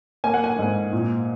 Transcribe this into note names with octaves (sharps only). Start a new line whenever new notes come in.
A#3 G#5
F#5
G#5
G#2
A#2